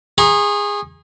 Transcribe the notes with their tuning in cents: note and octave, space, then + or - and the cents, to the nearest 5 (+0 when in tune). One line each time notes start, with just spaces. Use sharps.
G#4 -20 A#5 +35 C#6 -40